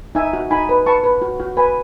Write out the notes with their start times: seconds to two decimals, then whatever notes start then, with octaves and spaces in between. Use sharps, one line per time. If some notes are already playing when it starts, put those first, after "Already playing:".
0.15 D#4 E5 G#5
0.33 F#4
0.51 D#4 G#5 B5
0.69 B4
0.86 B4 A5 C#6
1.03 B4
1.22 F#4
1.40 F#4
1.57 B4 G#5 B5